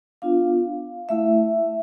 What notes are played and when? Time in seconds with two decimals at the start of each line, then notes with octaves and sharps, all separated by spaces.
0.22 B3 D4 F4 F5
1.09 A3 E4 E5